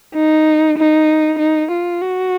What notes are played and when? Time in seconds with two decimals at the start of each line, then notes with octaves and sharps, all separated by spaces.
0.14 D#4
0.78 D#4
1.39 D#4
1.71 F4
2.02 F#4